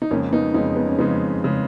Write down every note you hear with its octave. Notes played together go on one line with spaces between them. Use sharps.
D#4
F2 C#3 G#3 A#3 C#4
B3 D#4
F2 C#3 G#3 B3 D#4
B3
C#4
F2 C#3 G#3 B3 D#4
C#3 G#3